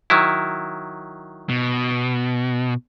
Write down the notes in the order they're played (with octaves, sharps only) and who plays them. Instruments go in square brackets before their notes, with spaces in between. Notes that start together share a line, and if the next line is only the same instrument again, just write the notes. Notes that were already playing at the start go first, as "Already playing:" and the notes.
[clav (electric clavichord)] D#3 F#3 E4
[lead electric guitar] B2